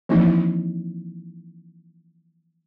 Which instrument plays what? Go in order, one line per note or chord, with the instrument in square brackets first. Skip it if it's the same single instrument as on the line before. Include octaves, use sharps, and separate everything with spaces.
[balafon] E3 F3 A#3 C4 D#4 E4